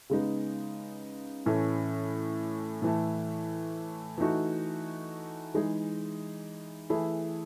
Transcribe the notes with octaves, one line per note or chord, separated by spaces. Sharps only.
C#3 G#3 B3 D#4
A2 E3 A3 C#4
A2 E3 A3
E3 A3 D#4 F#4
E3 G#3 D#4 G#4
E3 A3 E4 G#4